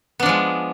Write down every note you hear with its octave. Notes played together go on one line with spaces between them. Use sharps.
F3 G#3 B3 D4